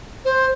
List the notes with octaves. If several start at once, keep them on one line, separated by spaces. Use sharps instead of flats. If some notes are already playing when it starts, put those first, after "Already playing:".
C5